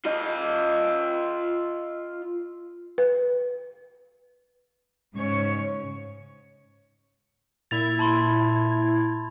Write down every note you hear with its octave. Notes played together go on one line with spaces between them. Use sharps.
F4 D#5
B4
G#2 C#3 C#5
A#2 E4 G#6 A6 F7
A5 B5 C6